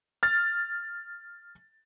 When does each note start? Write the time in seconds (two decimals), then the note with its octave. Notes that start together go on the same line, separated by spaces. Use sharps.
0.23 F6 A6